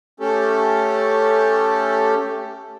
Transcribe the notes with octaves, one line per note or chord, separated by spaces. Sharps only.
A3 C#4 G4 A4